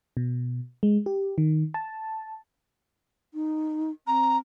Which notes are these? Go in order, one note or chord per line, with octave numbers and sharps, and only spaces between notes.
B2
G#3
G4
D#3
A5
D#4
C4 A#5